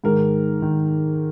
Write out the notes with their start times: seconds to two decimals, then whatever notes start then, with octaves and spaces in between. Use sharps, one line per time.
0.04 G#2 D#3 A#4
0.62 D#3